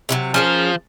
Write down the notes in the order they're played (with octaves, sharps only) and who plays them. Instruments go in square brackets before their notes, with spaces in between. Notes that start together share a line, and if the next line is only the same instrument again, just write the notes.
[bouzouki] C3 D#3 F#3
[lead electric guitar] F3 [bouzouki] C#4 G#4 A#4